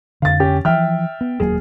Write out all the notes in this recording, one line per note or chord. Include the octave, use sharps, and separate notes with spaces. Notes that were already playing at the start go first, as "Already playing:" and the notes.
F2 D3 F5 A6
C#4 G4
E3 F3 E5 G5 F6
B3
D#1 F#3 A#3 G#4